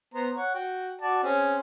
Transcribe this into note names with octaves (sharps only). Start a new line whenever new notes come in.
B3 C5 A#5
C#5 F#5
F#4 G5
F#4 D5 A5
C4 C#4 G#4